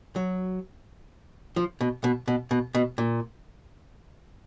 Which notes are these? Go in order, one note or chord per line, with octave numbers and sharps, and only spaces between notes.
F#3
F3
B2
B2
B2
B2
B2
A#2